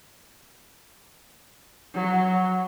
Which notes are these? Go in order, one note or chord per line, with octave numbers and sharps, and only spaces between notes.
F#3